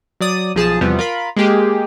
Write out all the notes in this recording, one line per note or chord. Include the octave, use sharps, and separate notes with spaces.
F#3 D5 D#6
B1 F3 G#4 A5
E2 C3 F3 G3 B3 C4
F4 A#4 B5
G#3 A#3 G4 G#4